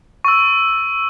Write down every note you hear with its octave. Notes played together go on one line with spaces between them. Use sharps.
C#6 E6